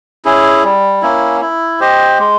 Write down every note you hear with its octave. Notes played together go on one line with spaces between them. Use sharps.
C#4 E4 G#4
G3
A#3 C#4 E4
E4
G4 C5 D#5
G#3